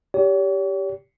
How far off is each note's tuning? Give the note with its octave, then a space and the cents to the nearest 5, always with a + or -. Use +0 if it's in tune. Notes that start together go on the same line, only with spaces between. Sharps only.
G4 +0 C#5 +45